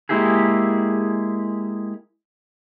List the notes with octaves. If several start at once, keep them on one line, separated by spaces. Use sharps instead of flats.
G#3 A#3 E4 G4 G#4